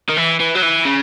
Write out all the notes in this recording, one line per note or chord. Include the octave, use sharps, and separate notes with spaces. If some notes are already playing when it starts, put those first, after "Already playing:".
D#3
E3
E3
F#3
E3
C#3